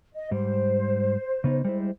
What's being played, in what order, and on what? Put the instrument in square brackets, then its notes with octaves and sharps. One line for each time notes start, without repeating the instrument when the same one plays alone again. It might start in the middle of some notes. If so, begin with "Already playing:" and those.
[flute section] D#5
[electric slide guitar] G#2 G3 [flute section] C5
[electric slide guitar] C#3 B3 D#4
G3 G#3 E4